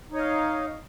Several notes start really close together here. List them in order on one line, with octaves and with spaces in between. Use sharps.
D#4 C#5 D#5 F5